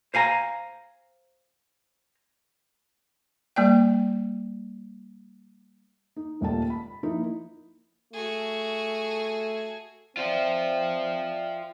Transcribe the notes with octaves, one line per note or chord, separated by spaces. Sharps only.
C5 F5 G#5 A#5
G3 A#3 D5 G5
D#4
D#1 C#2 A#2 A3 G5 A5
B5
F3 A#3 D#4 E4
A3 F#4 G#4
C4 F4 C5 D5 E5 G5